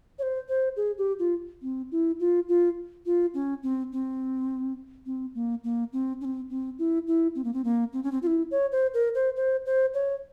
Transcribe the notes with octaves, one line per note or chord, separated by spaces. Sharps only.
C#5
C5
C5
G#4
G4
F4
C4
E4
F4
F4
F4
C#4
C4
C4
C4
A#3
A#3
C4
C#4
C4
C4
E4
E4
C4
A#3
C4
A#3
C4
C#4
C4
F4
E4
C#5
C5
A#4
C5
C5
C5
C#5